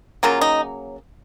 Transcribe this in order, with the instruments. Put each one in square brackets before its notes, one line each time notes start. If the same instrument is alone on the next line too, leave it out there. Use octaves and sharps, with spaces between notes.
[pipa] C#3 F#3 A#3 F4
D#4